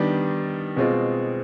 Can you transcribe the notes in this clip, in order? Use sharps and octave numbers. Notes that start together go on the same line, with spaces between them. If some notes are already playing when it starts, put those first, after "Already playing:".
Already playing: D#3 G3 B3 D4
B2 G#3 C4 F4